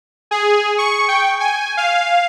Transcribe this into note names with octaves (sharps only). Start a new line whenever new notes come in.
G#4
C#6
G5
G#5
F5